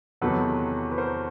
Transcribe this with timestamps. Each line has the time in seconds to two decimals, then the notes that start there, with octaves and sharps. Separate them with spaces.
0.21 E2 C3 D#3 F#3 A4 B4
0.92 B4
0.98 A#4 C5